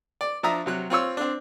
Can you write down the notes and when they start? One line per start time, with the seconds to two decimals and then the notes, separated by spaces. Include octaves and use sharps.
0.21 D5
0.43 F3 D4 E5 A#5 D#6
0.66 C3 F#3 F#6
0.90 C4 F4 C#5 E6
1.17 C4 D4